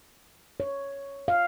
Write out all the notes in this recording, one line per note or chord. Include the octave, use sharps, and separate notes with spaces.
C#5
F5